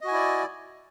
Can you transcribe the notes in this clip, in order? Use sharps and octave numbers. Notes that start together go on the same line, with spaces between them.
E4 F#4 D5 D#5 G#5